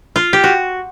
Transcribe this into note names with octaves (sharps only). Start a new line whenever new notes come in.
F4
G4
F#4